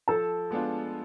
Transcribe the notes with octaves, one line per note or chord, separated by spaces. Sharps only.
F3 A4 A5
G#3 B3 D4 F4